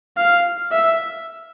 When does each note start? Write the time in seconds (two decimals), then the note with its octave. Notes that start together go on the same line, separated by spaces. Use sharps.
0.17 F5
0.72 E5